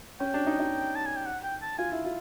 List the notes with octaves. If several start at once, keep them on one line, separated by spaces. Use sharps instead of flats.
C#4 G5
D4
D#4
D#4
A5
G#5
G5
F#5
G5
A5
F4 G#5
E4
F4